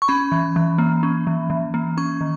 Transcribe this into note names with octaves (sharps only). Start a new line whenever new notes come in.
C#6
C#4 B5
E3
E3
A#3
C#4
E3
E3
A#3
C#4 C#6
D#3